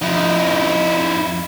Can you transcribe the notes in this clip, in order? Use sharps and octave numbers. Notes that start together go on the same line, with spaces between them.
F2 D#4 E4